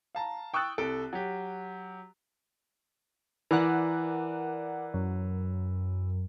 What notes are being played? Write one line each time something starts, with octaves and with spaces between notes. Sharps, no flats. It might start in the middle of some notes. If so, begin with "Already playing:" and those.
F5 A5 A#5
G5 C#6 D#6 E6 F#6 A6
C2 A4 D7
F#3 G4
E3 A#4 D5 F#5
F#2